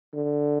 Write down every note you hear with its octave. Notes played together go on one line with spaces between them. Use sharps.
D3